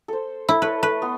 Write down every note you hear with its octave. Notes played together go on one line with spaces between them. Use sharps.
A4 C5
E4 A4
A4 B4 C#5
A3 B4
B3 C6